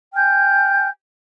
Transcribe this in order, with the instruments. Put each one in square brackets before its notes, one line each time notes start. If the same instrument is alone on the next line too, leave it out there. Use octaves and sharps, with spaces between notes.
[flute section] G5 G#5 F6 G6